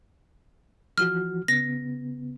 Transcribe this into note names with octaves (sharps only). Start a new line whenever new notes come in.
E3 F3 F#4 F6
C#3 B3 A#6